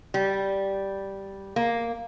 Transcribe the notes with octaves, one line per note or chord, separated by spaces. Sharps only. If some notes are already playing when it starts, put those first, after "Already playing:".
G3
A#3